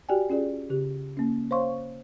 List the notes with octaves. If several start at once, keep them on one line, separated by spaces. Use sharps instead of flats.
F#4 G4 D5 G5 G#5
C#4 F4 G#4 D5
C#3 G4
A#3 C#4
C5 C#5 F5 C6 C#6